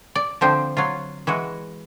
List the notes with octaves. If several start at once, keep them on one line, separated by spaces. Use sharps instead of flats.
D5
D3 F3 C4
F#3 F4
E3 G#3 F#4